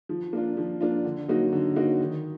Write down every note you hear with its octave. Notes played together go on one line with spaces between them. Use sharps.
F3
A#3 D4 F4
F3
A#3 D4 F4
D3
F#3 A#3 D#4 F#4
D3
F#3 A#3 D#4 F#4
D#3